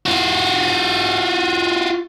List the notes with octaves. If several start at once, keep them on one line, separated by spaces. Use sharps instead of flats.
F4 F#4